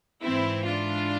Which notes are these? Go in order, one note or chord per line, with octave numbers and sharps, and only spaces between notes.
G#2 E3 C4 E4
D4 F4